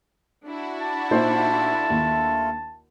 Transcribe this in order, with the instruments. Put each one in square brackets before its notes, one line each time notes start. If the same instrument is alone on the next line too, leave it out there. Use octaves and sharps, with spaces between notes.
[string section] D4 E4 F#4
[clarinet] A5
[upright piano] A#2 D#4 C5 [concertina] A3 F4 A4
[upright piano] D#2